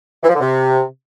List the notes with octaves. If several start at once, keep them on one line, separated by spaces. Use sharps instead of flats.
E3
F3
D3
C3